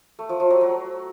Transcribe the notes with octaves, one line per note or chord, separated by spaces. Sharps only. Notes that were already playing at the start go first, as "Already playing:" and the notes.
A3
F3
F3
F#3
F#3